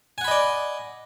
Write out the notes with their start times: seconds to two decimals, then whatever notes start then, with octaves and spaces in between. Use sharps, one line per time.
0.18 G#5
0.21 F#5
0.24 B5
0.28 D#5
0.31 D5